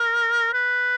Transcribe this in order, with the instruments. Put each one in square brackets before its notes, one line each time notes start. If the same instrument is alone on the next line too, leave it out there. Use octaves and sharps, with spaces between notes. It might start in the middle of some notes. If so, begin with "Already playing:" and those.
Already playing: [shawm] A#4
B4